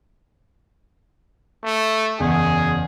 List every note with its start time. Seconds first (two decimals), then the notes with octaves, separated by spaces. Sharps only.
1.64 A3
2.19 F#1 E2 G#4